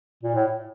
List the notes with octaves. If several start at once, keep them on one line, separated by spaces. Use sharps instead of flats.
A#2
A2